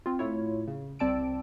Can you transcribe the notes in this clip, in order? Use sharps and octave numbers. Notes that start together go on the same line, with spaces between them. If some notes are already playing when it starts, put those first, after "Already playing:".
C4 F4
A2 A3 E4 F4 C#5
C#3
C2 C4 D5 A5 E6 D7